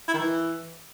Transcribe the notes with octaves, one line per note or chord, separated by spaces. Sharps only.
E4
D#3
E3